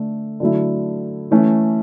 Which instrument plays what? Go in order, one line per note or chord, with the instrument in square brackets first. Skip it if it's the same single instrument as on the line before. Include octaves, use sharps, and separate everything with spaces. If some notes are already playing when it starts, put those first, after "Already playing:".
Already playing: [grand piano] D3 A3
D3 F#3 A3 E4
E3 A3 C#4